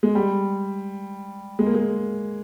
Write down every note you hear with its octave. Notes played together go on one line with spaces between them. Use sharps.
G#3
G3
G#3
A#3
G#3